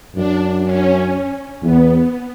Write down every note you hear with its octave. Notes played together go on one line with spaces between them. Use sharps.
F#2 D4
C#4
E2 B3